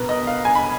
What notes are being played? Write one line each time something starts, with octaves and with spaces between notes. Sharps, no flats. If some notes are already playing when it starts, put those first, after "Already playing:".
Already playing: B2 A#4 B4
D#5
F5
G#5
B5